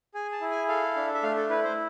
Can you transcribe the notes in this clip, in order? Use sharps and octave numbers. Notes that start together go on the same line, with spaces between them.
G#4 G#5
A5
E4
G#5
A4 F5
D4
E5
A3 F5
A4
E4 B4
C5